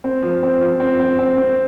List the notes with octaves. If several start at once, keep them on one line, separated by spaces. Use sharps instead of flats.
C4
F3
C4
F3
C4
C4
C4
C4